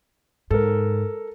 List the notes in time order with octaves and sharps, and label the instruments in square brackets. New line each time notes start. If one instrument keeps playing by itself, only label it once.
[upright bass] G#2 [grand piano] A4 A#4